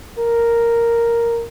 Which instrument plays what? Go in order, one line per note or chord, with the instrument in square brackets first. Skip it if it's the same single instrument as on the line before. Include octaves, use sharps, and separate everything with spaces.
[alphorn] A#4